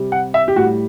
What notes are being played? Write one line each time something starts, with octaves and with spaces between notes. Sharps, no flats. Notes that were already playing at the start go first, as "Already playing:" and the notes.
Already playing: C3 G3
F#5
E5
G4
A2 G3 F#4